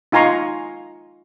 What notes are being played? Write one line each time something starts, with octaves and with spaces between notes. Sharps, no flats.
D#4 F4 G#5 A#5 C6 C#6